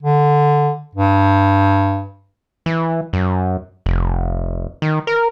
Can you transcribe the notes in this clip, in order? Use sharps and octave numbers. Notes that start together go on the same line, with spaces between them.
D3
G2
E3
F#2
F1
D#3
A#4